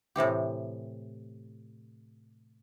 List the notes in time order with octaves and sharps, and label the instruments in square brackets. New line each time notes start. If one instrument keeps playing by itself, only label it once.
[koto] A2 C3 E3 G4